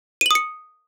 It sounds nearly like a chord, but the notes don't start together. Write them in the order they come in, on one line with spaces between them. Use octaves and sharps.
D#7 F#7 D#6 C#7